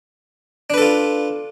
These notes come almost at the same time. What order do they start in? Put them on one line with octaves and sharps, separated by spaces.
D4 B4 A4 F4